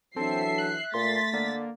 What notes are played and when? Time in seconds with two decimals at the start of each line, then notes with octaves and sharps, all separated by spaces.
0.16 E3 F#3 C4 D4 A4 E5 C7
0.58 F#6
0.94 A#2 A3 C6 A6 B6
1.33 D3 A#3